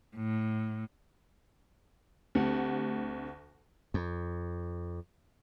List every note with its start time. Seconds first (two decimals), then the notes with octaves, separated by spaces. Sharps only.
0.16 A2
2.35 D2 A3 C4 G4 F#5
3.94 F2